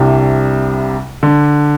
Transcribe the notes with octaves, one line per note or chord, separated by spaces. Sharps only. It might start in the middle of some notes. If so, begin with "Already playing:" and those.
Already playing: C2 C3 G3 D4
D3